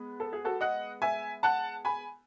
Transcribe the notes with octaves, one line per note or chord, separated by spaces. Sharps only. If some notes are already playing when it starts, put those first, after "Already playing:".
Already playing: G#3 B3
A4
G#4
F#4 A4
D#5 F#5
E5 G#5
F#5 A5
G#5 B5